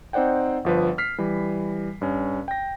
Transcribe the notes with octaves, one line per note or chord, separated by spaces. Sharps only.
C4 D#4 C5 D5 F#5 G5
G1 F3 B4
F6 B6 C7
E3 G3
G2 C#4
G5 A#6